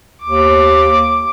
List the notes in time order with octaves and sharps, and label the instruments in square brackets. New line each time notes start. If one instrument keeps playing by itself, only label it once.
[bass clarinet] D#2 [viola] D6